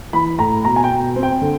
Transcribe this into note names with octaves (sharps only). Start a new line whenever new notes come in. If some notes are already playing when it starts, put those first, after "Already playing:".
E3 B5
A2 A#5
B2 A#5
G#5
G5
B2
C4
G5
D3